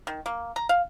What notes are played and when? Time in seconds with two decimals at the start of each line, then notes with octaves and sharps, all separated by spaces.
0.07 D#3
0.26 A#3
0.56 A#5
0.69 F5